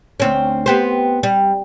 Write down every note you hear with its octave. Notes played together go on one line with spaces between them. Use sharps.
D2 C4 C#4
B3 G4 C5
G3